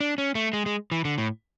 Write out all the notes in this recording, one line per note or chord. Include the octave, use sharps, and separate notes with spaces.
D4
C#4
A3
G#3
G#3
E3
D3
A2